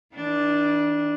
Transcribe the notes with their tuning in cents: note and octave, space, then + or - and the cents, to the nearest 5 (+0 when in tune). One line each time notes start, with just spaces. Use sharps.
E3 -45 D4 +0